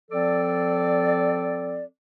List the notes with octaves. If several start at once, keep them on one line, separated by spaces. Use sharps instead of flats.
F3 C4 A4 D5